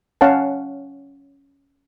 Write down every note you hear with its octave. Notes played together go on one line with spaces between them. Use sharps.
C#4 C#5 F5 F#5 A5